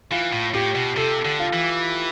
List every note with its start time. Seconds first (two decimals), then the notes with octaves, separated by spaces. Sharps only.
0.12 E3 F4
0.33 A2
0.54 A2 G4
0.76 B2
0.97 C3 A4
1.25 D3
1.39 F4
1.53 E3